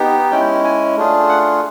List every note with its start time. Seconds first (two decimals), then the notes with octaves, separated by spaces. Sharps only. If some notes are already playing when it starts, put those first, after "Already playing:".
Already playing: B3 D#4 G4
0.31 G#3 C#4 E4 G5
0.64 G#5
0.97 A3 D4 F4 G#4
1.29 F#5